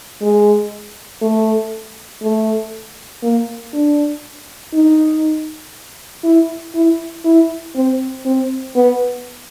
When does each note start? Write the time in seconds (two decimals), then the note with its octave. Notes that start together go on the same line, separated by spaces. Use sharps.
0.22 G#3
1.22 A3
2.23 A3
3.23 A#3
3.73 D4
4.74 D#4
6.24 E4
6.74 E4
7.25 E4
7.75 C4
8.25 C4
8.76 B3